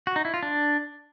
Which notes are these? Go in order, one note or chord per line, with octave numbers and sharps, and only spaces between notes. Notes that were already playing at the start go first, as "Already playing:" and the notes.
F#4
D#4
E4
F4
D4